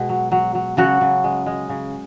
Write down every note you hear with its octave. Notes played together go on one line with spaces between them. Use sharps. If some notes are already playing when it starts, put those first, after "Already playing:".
Already playing: B2 G#3
F#3
F#3
F#3
C#3 F#3 F#4
C#3
G#3
G#3
C#3